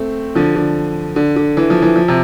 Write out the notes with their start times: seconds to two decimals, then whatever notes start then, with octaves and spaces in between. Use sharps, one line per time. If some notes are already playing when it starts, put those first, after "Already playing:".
Already playing: A3 C4
0.35 D3 F3
0.56 D3
1.16 D3
1.36 D3
1.57 E3
1.70 F3
1.82 E3
1.96 F3
2.08 C3